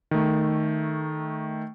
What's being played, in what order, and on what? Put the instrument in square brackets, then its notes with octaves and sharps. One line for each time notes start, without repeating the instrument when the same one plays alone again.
[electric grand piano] D#3 A3